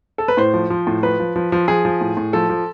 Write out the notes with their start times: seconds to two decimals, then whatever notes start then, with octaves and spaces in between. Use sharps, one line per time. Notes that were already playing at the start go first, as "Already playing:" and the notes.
0.18 A4
0.28 B4
0.37 A2 C5
0.54 F3
0.70 F3
0.87 A2
1.03 F3 B4
1.20 F3
1.36 F3
1.52 F3
1.68 F3 G#4
1.85 F3
2.01 A2
2.17 A2
2.33 F3 A4
2.50 F3